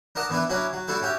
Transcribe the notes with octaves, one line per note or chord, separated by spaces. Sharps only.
D4 A#4 D#5 F#5 A5
E3 B3 D4 E4 B4
F#3 C#4 D4 E4 F#4
F#3
G3 D4 E4 F#4 A4
C#4 F#4 G4 E5